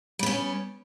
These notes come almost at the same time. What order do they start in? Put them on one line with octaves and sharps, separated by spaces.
G3 B3 C#4